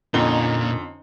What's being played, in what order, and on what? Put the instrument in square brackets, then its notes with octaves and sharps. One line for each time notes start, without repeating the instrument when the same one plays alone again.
[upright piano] F2 D3 G7 [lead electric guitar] A#2 [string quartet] C#4 D#4